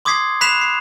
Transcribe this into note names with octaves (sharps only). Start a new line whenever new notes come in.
C6 D6 D#6 G#6 B6 C7
B5 F#6 B6 C7 E7 F7
C7